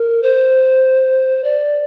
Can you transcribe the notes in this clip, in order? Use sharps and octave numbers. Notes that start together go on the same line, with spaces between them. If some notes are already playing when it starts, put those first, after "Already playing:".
Already playing: A#4
C5
D5